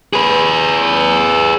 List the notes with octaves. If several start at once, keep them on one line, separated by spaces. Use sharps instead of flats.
G#4 B4